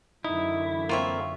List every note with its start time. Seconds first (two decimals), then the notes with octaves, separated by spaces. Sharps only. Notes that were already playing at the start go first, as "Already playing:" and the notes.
0.24 F#2 D3 E3 D#4 E4
0.89 A#3 C4 F4 C#5 E5